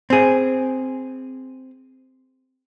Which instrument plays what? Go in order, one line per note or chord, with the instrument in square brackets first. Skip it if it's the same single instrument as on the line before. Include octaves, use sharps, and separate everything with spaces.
[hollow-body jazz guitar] C4 G#4